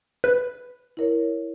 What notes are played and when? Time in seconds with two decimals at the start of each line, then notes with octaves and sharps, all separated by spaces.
0.24 B4
0.97 E4 A#4 C#5